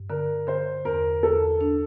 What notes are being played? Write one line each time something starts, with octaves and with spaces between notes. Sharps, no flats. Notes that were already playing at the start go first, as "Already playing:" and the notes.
Already playing: G2
D3 A#4
D3 C5
E2 A#4
E2 A4
D4